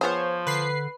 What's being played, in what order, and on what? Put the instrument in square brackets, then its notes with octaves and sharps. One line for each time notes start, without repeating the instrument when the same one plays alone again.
[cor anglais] F3 [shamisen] B3 F4 G#4 [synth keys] C5 C#5
[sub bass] D3 [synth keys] B4 C7